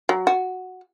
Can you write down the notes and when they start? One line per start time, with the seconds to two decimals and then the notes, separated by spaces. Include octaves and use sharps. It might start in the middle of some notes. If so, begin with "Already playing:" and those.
0.09 F#3
0.27 F#4